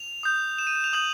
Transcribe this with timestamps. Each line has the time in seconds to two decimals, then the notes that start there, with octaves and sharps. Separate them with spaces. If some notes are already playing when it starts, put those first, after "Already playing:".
Already playing: F7
0.23 D#6 G6
0.58 E7
0.67 D#7
0.75 E7
0.84 F7
0.93 D#6 G6 F#7